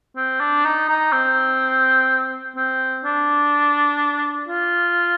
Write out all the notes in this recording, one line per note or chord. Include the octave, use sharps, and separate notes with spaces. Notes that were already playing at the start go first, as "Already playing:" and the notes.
C4
D4
D#4
D#4
C4
C4
D4
F4